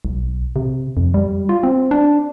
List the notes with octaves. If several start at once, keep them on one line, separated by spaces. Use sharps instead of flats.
B1
C3
F2
G3
F4
C4
D4